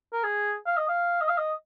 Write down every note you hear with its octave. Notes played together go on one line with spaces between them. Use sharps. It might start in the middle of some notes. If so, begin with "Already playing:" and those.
A#4
G#4
F5
D#5
F5
D#5
F5
D#5